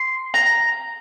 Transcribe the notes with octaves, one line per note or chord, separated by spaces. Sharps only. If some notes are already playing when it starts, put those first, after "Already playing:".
Already playing: C6
A#5